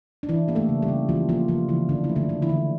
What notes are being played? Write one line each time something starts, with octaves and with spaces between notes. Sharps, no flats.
D4
E3 E4
A#3 G4
A3 A4
C#3
G3 G4
C#3
E3 F3 F4
F3 A#3 F4
C#3 F3 F4
C#3 E3 E4
D3 F3 D4
E4
A3
D3 D4
D3
E3 E4
D3